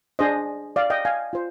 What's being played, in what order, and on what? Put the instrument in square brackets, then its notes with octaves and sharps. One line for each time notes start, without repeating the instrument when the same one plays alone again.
[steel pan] D4 G#4 C5 D#5
D5 F5
D#5 G5
F5 G#5
F4 C5